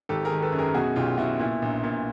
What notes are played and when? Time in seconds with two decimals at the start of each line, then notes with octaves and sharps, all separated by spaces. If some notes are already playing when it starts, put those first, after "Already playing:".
0.09 G#1 G4 A4
0.25 G#4 A#4
0.31 D#3
0.42 A4 B4
0.52 F#2
0.59 G#4 A#4
0.74 B2 F#4 G#4
0.96 B1 F4 G4
1.18 B2 E4 F#4
1.39 A#2 E4
1.62 A#1
1.84 A#2